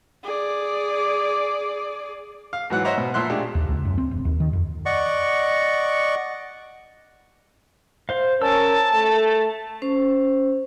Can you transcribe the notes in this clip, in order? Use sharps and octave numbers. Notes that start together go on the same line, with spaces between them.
G#4 D5
F5
G#2 E3 F#3 F#5 F#6
C5 C#5 D#5 E5 F#5 A#5
B2
A#2 F3 E5 C6 F#6
G#3 A3 D4 F4 G4
D#2
C#2
F#2
C4
E1
D#2
D#3
F2
D5 D#5 F#5 C#6
C5 F5
C#4 A#4 A5 E6
A3 A4
C#4 C5